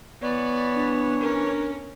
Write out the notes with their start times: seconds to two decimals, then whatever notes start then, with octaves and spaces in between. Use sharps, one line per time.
0.22 E3 B3 C#5 D5
0.75 D4
1.21 C#4 A#4